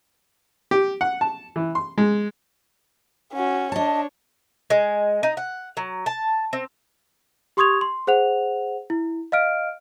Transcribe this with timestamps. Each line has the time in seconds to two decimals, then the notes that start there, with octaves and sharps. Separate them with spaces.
0.71 G4
1.01 F#5
1.21 A5
1.56 E3
1.75 C6
1.98 G#3
3.33 C#4 F#4
3.72 D4 C#5 D#5 A5
4.70 G#3
5.23 D#4
5.37 F#5
5.77 F#3
6.06 A5
6.53 C4
7.57 G4 C6 C#6 D#6 G#6 F7
7.81 C6
8.07 G#4 C5 F#5 F7
8.90 E4
9.32 D#5 F5 F6 D7